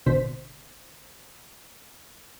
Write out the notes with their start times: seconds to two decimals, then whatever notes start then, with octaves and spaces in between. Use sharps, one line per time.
0.06 G#1 B2 D3 C5 B6